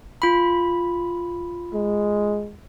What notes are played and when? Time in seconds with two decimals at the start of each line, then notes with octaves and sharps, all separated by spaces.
0.22 F4 B5
1.74 G#3